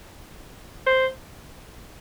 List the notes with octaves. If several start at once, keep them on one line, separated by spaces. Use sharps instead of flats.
C5